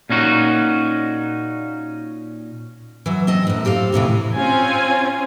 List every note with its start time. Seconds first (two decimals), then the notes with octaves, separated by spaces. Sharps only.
0.09 A#2 C#4 D#4 F#4
3.06 E3 F#3
3.27 C4 D#5 A5
3.47 F#2 A2
3.65 C4 G4 A4 F5
3.92 F2 A2 C3 E3
4.36 C4 C#4 F4 G#5